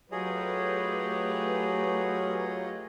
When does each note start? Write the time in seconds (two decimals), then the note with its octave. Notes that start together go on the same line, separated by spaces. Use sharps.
0.12 F#3 A3 F4 G4 G#4 B4 C#5 D#5